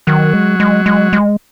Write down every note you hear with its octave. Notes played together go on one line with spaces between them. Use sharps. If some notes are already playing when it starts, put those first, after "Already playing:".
D#3 F#3
G#3
G#3
G#3
G#3